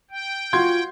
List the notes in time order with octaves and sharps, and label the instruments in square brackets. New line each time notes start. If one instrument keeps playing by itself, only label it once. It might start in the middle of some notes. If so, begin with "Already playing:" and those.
[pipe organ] G5
[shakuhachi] F4 [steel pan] F#4 F5 [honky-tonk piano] C6 G6 G#6